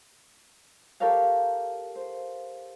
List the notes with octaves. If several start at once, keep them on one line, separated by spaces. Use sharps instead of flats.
G4 A4 A#4 C#5 F5
C5